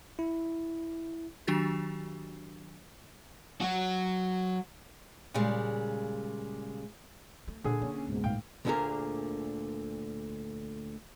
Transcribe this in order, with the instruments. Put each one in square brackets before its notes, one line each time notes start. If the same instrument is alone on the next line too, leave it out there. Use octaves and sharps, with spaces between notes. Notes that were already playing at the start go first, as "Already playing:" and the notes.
[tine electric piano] E4
[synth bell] D#3 F#3 D4 F#4 G4 A6
[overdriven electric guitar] F#3 F#4
[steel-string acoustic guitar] A#2 C#3 G3 G#3
[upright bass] A3
[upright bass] A#2 [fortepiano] D3 G#4
[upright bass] A#3 [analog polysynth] C#4
[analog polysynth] C#2 G#2 B2
[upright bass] A2 [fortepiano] F5 G5
[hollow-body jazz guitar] D2 A#2 D3 A#3 G#4 A#4